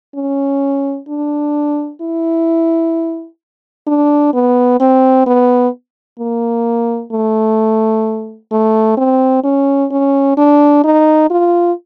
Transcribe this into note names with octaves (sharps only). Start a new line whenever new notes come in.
C#4
D4
E4
D4
B3
C4
B3
A#3
A3
A3
C4
C#4
C#4
D4
D#4
F4